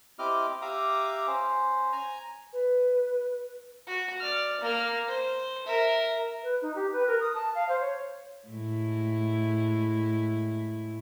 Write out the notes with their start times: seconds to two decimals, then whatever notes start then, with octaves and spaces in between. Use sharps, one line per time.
0.19 C4 E4 G4 D#5 D6 F6
0.62 G4 E5 F5 A#5 D6 D#6
1.27 C#4 C5
1.92 G#5 A#5
2.53 B4
3.87 F#4
4.20 D5 F6
4.61 A#3 F6
5.08 C5
5.66 A#4 E5
6.43 B4
6.62 D#4
6.75 G4
6.93 B4
7.07 A#4
7.20 D#6
7.34 A5
7.55 F5
7.69 C5
7.80 C#5
8.48 A2 G#3 E4